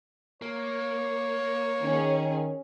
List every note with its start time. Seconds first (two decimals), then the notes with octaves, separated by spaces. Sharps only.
0.42 A#3 C#5
1.82 D#3 C#4 G#4